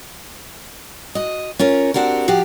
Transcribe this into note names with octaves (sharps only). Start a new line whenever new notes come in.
F#4 D#5
C#4 F4 A#4 C#5
C4 D4 F#4 G4 A#4
F3 F#4 G4 F5